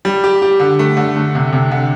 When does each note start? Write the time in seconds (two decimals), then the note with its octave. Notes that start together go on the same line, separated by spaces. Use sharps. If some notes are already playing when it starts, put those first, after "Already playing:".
0.05 G3
0.24 G4
0.42 G4
0.60 D3
0.79 A3
0.97 D3
1.16 A3
1.35 C3
1.52 C3
1.71 D3